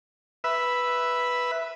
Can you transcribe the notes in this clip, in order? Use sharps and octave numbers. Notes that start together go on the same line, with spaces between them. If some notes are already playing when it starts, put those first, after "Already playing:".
B4 E5